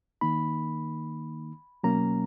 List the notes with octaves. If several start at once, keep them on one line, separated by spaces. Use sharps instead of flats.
D#3 A#3 D#4 B5
B2 F#3 A#3 C#4 A#5